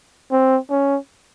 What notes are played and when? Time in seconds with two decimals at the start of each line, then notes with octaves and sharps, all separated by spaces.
0.31 C4
0.70 C#4